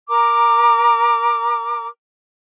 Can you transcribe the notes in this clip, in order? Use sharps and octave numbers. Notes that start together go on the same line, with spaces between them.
A#4 A#5 D6